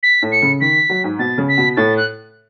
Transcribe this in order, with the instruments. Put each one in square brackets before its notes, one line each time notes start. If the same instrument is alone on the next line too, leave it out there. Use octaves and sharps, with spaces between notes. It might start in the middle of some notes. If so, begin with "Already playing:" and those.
[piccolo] B6
[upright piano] A2
[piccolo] C#7
[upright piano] C#3
[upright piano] D#3 [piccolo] B6
[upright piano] F#3
G#2
[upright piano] B2 [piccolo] A6
[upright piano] C#3
[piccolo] B6
[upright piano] B2
[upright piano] A2 [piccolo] A6
[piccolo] F#6